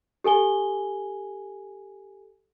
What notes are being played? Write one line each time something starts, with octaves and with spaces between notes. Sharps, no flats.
G4 A4 G#5 G7